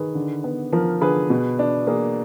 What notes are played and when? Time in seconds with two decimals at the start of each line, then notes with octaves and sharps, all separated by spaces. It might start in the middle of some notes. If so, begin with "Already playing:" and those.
Already playing: D#3 G#4 B4
0.15 D3
0.44 B3
0.72 F3 A#4
1.01 D3 G#4 B4
1.30 B2
1.59 D4
1.87 A#3 G#4